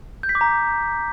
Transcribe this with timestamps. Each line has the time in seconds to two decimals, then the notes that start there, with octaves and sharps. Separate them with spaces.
0.23 G6
0.29 B6
0.35 D6
0.41 A#5